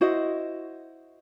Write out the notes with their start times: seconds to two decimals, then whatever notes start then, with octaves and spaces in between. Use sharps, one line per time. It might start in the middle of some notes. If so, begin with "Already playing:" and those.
0.01 E4 F#4 C5 D#5